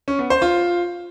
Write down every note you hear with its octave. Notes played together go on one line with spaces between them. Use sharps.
C#4
B3
C5
F4